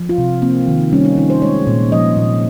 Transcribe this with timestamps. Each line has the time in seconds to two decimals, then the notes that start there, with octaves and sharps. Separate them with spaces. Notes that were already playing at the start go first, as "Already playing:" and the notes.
Already playing: F3
0.09 F4
0.18 C3
0.42 A#3 C4
0.68 D#3
0.92 G3 C#4
1.05 D#4
1.17 D#3 D#4
1.30 C5
1.42 G#3 C#5
1.67 A#2
1.92 F3 D#5
2.17 A#2